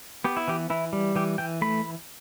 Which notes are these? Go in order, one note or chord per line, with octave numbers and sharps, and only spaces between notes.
B3 G4
E4
E3 G4
E3 E4
G3
E3 G4
E3 G5
A3 B5